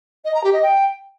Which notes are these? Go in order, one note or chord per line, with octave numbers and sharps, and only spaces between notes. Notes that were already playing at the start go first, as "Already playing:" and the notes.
D#5
A#5
G4
D#5
G5